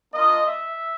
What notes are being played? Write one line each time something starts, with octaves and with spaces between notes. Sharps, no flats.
A#3 D4 F4 D#5
E5